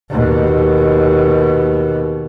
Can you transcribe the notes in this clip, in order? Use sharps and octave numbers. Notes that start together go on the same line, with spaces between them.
D#2 B2